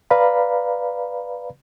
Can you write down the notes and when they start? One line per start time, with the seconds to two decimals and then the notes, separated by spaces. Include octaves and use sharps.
0.11 B4 D5 F5 A#5 B5